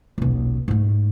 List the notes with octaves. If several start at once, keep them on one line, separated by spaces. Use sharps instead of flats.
D#1 B1
G#2 A3